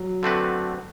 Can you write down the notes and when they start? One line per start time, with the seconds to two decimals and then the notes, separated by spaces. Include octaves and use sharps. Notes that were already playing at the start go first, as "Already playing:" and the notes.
Already playing: F#3
0.23 D3 A3 C4 F#4 B4